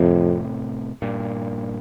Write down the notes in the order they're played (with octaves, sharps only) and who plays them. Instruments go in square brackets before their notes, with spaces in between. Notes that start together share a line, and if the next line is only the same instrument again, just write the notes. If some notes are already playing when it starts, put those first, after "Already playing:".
Already playing: [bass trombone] F2 [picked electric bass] A2 C3
[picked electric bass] G2 A#2